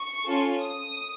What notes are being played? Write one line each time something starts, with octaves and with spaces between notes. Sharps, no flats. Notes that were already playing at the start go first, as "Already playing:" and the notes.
Already playing: C#6
C#4 F4 A4
D#6